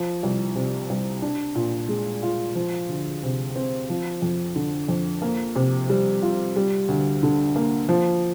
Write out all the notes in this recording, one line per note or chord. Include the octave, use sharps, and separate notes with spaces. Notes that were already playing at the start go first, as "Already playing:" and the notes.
Already playing: F3
C2
C3
C2
D4
A#2
G#3
F4
F3
D2
C3
C4
F3
F2
D3
F2
A#3
C3
G3
F4
G3
D2
D3
A#3
F3